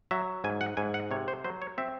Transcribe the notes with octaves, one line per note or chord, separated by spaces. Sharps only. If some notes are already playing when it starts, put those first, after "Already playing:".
F#3 E5
G#2 G#5
F#5
G#2 G#5
F#5
C3 C#5
C5
F#3 C5
C#5
C4 E5